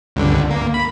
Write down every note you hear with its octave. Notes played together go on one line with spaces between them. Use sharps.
C#2 G2 D3
A#3
B5